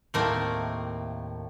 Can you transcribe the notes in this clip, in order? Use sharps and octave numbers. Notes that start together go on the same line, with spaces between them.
D#2 A2 A3 A#3 C4 A5